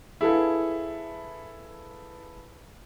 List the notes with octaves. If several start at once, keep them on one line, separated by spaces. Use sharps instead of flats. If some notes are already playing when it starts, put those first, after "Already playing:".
E4 G#4 A4 B4 F5